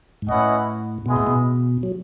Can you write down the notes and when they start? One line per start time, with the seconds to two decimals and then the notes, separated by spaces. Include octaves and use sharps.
0.22 G#2
0.28 A2 C#4 E4 B4 D#5 F#5
1.06 B2 G#3 B3 E4 G#4 D#5
1.16 A2
1.27 B2
1.83 F#3